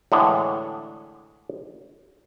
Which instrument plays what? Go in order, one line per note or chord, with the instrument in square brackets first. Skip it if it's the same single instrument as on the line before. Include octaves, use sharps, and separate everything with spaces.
[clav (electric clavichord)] A2 D3 E3 G#3